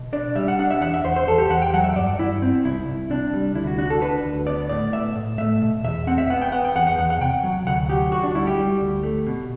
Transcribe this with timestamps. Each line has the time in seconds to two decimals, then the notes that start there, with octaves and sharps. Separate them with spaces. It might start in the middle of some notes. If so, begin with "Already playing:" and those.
Already playing: B2
0.13 D4 D5
0.35 G3 E5
0.48 F#5
0.59 D4 F#5
0.71 E5
0.81 E2 F#5
0.94 E5
1.04 E2 C5
1.16 C5
1.27 E2 A4
1.38 G4
1.50 E2 F#5
1.62 G5
1.74 F#3 F#5
1.84 E5
1.96 G2 D5
2.19 G2 E4
2.42 C4
2.64 C2 E4
2.87 C2
3.10 C3 D4
3.34 G3
3.55 D2 E4
3.67 F#4
3.78 D4 F#4
3.90 A4
4.01 D4 B4
4.25 D2
4.47 B3 D5
4.69 A2 D5
4.93 A2 E5
5.16 A2
5.38 A3 E5
5.62 B2
5.84 E2 E5
6.07 C4 F#5
6.18 E5
6.30 B3 F#5
6.42 G5
6.52 B3 F#5
6.65 G5
6.75 E2 F#5
6.87 F#5
6.98 E2 F#5
7.10 F#5
7.21 C3 G5
7.44 F#3
7.67 D2 F#5
7.90 F#3 G4
8.12 D2 F#4
8.23 D4
8.35 G3 E4
8.47 G4
8.58 G3
8.81 D2
9.03 A3
9.27 B2